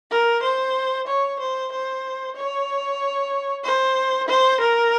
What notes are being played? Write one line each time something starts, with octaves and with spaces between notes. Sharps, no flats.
A#4
C5
C#5
C5
C5
C#5
C5
C5
A#4